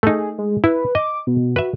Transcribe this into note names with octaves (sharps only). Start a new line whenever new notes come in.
A3 D#4 G#4
G#3
E4 B4
D#5 D6
B2
F#4 B4 E5